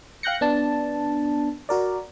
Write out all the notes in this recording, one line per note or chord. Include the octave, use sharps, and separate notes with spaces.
F5 G5 F#6 G6 A#6 C#7
B3 D4 A5
F#4 A#4 D5